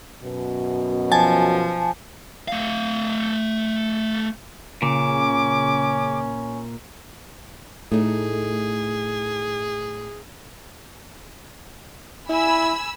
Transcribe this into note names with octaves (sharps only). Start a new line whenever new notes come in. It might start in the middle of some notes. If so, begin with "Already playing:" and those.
F#2 B2
F3 G#5 A5
A3 F5
A#2 C#3 C#4 D6
A2 A3 D#4 G#4
E4 G#5 B5 E6